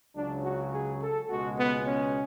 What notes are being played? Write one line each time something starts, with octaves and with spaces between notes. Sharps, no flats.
C#2 C#3 F#3 D4
F#4
G#4
A4
C#2 B2 G#3 F#4
B3
C#4